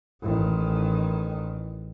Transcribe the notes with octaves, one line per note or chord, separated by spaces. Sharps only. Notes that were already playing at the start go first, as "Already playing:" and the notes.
A1 D#3